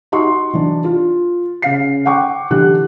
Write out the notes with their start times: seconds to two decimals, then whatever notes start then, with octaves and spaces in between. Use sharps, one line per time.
0.12 D#4 F#4 D#5 C6 C#6
0.54 E3 D4
0.84 F4
1.62 C#3 F5 C7
2.05 F#5 G5 C#6 D6
2.51 D3 E3 G4 F#6